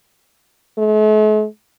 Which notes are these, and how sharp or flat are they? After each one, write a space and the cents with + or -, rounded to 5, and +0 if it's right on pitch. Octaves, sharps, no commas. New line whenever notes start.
A3 -45